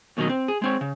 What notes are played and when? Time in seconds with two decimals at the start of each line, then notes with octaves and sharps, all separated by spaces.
0.17 D#2 B2 D#3 F#3 D#5
0.29 C4
0.48 G#4
0.62 G#3 C4 C#5
0.81 C#3